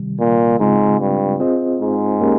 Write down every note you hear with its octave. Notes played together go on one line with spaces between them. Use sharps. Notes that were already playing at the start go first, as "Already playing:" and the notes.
Already playing: C3 D#3 G3
A#2
G#2 C#3 G#3 C4 F4
G2
C4 F4 G#4 C5 D#5
G#2
A#3 C#4 G4 A#4